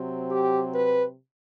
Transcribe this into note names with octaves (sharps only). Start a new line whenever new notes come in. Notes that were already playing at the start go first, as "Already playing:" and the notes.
Already playing: C3 F#3 C4
G4
B4